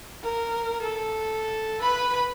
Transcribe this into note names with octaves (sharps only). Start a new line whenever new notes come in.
A#4
A4
B4 B5